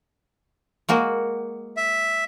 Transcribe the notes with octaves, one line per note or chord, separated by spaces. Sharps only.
G#3 A#3 F#4
E5